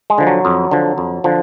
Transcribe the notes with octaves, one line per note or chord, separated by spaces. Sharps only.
G#3
D3 F3
F#3
F2
D3 F3
F2
D3 F3